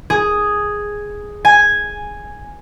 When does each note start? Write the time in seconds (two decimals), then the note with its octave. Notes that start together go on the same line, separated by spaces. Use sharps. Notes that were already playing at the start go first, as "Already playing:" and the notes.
0.10 G#4
1.45 G#5